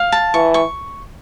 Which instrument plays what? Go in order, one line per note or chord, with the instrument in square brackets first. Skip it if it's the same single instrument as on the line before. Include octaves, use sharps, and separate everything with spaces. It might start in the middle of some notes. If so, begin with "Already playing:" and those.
Already playing: [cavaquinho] F5
A5
[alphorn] E3 [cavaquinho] C#6
[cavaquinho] C#6